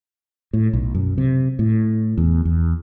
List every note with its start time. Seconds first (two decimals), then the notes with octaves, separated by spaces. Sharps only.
0.53 A2
0.73 B1
0.94 F#2
1.18 C3
1.59 A2
2.18 E2
2.45 E2